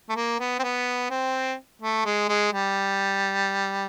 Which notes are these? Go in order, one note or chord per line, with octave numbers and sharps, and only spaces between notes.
A3
A#3
B3
C4
B3
C4
A3
G#3
G#3
G3